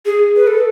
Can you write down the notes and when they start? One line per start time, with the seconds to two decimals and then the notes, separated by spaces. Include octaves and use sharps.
0.06 G#4
0.36 B4
0.47 A4